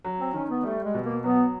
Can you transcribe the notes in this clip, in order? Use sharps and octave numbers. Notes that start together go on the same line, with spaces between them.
F#3
C4
D#3 C#4
B3
G3 A3
G#3
B2
A#3
F#3 B3